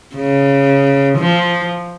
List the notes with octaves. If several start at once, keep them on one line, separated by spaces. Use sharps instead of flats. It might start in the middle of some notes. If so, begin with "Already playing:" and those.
C#3
F3